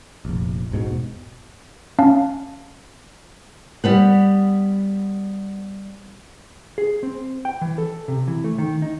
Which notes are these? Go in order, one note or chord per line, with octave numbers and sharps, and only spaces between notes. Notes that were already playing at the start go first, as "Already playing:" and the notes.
F1 A#1
E1 G#2 B2
C#4 F5 A5
G3 B3 F#5
G#4
C4
G5
E3
A4
C3
E3
A3
D#3
D#4